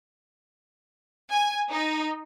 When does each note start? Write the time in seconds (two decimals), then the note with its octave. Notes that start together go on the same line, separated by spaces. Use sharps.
1.31 G#5
1.70 D#4